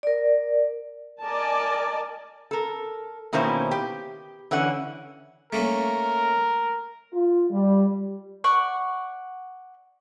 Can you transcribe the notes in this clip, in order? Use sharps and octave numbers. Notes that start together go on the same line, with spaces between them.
A#4 D5
A#4 D5 D#5 G#5 A5
A4 A#4
B2 D#3 A#3 C#4 E4 C5
G4
D3 E3 C#4 F#5
A3 A#3 C#4 A#4
F4
G3
D5 F#5 C#6